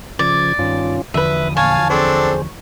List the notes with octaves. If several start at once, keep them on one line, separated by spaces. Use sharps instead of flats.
C#3 F3 D5 G#6
G2 D#3 C#4 F4
E2 D3 F3 B4 E5 D#6
A#2 C#5 F5 G#5 A5
C4 D4 G#4 A4 C5